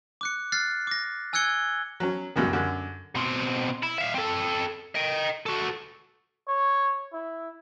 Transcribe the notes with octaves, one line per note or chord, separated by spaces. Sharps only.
D6 F#6 C#7
F6 F#6 A6 C7
D6 A#6
G#5 E6 F#6 G#6 C#7 G7
F#3 C#4
C#2 F#2 B2 G3
F#2 D3
B2 C4
E4
E5 F5
C4 A4
D#5 G5
F#4 A4
C#5
E4